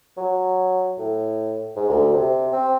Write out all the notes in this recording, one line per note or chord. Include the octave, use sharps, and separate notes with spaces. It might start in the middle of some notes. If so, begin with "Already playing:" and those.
F#3
A2
G#2
D2
C3
C4